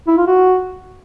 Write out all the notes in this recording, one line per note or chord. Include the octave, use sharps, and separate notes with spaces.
E4
F4
F#4